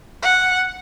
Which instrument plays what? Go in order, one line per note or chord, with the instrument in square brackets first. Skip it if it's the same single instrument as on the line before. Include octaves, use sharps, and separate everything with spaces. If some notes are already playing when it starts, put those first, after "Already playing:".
[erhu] F#5